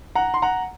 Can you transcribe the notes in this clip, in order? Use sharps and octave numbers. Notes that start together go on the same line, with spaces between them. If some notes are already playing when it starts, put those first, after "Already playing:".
F#5 A#5
C6
F#5 A#5